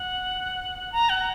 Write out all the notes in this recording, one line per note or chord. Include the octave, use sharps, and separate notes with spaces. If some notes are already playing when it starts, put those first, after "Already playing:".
Already playing: F#5
A#5
F#5